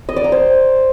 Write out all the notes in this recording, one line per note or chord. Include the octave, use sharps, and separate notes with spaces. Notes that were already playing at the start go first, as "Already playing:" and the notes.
D#5
D5
A#5
C5